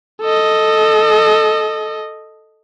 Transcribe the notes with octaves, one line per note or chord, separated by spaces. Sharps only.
A4 D#5